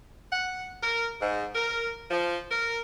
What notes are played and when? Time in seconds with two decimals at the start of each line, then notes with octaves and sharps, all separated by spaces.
0.32 F#5
0.82 A#4
1.21 G#2
1.55 A#4
2.11 F3
2.51 A#4